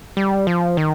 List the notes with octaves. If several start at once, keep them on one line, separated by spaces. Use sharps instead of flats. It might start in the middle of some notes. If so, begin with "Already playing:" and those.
G3
F3
D#3